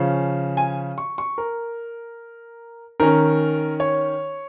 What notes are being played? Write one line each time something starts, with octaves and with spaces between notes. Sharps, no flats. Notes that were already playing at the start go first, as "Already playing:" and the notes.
Already playing: C#3 F3 C#4 F5
G#5
C#6
C#6
A#4
D#3 C#4 A#4
C#5